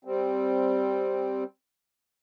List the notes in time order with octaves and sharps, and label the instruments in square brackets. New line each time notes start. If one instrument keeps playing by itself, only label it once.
[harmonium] G3 C4